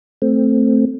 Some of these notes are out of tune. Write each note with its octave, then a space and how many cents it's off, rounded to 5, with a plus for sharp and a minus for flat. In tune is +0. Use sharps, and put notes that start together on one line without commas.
A3 +0 C4 +0